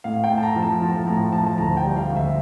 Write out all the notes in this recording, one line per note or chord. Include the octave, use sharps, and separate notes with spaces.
A2 F5
G5
A2
A5
A#5
F3
A5
F3 A#5
A2 A#5
F3 A5
A5
D2 A#5
G5
G3
F5
D2
E5